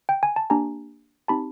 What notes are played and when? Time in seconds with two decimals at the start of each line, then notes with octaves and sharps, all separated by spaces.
0.09 G5
0.23 G#5
0.36 A5
0.50 A#3 D4 G4 G#5 A#5
1.28 C4 D#4 G4 A5 B5